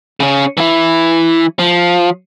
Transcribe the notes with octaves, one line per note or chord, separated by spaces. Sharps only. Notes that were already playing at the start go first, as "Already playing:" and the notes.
C#3 C#4
E3 E4
F3